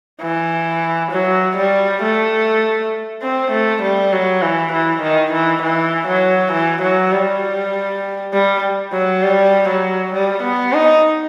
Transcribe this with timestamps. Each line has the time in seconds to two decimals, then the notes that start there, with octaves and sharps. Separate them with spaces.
0.22 E3
1.12 F#3
1.57 G3
2.03 A3
3.22 C4
3.52 A3
3.83 G3
4.13 F#3
4.42 E3
4.73 E3
5.02 D#3
5.33 E3
5.63 E3
6.08 F#3
6.52 E3
6.82 F#3
7.13 G3
8.33 G3
8.93 F#3
9.23 G3
9.69 F#3
10.14 G3
10.43 B3
10.74 D#4